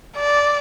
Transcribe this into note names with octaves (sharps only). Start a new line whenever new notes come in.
D5